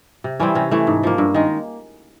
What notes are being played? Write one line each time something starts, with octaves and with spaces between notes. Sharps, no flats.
C3
E3 G3 C4 C#4
C3 C#4
E3 A3
G#2
F3 A#3
G2
D#3 G#3